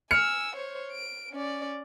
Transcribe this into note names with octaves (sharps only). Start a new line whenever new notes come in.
G#5 E6 F6 C#7
C5 C#5
D7
C#4 D5